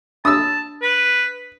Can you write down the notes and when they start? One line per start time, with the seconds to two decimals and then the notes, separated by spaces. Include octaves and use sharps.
0.25 D4 A5 D#6 E6
0.82 B4